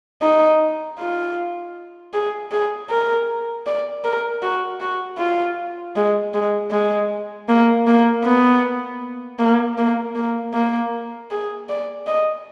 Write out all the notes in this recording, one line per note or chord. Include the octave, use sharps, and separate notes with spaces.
D#4
F4
G#4
G#4
A#4
D5
A#4
F#4
F#4
F4
G#3
G#3
G#3
A#3
A#3
B3
A#3
A#3
A#3
A#3
G#4
D5
D#5